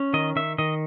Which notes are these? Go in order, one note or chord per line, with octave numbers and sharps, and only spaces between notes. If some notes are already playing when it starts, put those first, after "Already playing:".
Already playing: C#4
D#3 D#5
D#3 E5
D#3 D#5